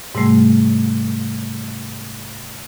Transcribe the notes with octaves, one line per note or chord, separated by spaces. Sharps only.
G#2 C3 G3 A3